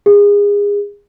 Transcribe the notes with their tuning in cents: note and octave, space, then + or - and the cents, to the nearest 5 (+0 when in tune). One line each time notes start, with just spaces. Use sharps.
G#4 -30